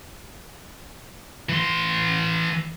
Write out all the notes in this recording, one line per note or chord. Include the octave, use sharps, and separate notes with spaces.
E3 C6